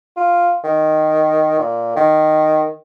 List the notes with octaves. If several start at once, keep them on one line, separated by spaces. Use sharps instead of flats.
F4
D#3
A#2
D#3